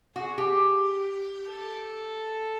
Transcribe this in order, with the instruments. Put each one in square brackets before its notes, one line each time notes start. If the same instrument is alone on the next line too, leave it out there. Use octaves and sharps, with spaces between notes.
[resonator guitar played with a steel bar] F#4 [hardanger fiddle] G#4
[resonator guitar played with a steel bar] G4
[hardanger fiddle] A4